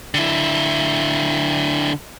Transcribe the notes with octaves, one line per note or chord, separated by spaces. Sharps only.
D3 E4